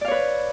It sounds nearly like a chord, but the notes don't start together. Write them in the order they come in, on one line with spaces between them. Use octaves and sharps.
D5 F5 C#5 B4